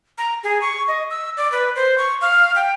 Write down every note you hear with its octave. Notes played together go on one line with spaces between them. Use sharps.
A#5
G#4
C#6
D#5
E6
D5
B4
C5
C#6
F5
G5